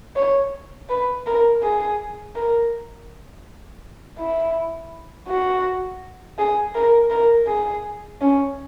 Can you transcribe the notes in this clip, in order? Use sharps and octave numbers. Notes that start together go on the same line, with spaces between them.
C#5
B4
A#4
G#4
A#4
E4
F#4
G#4
A#4
A#4
G#4
C#4